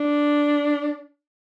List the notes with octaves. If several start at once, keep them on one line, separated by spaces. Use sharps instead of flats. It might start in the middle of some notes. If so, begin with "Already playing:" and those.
Already playing: D4